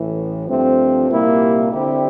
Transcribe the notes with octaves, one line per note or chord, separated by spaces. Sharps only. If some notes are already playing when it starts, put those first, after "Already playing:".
Already playing: A1 A2 E3
G2 F3 A3 C4
C2 A#2 G3 A#3 E4
D3 G3 C4 E4 G4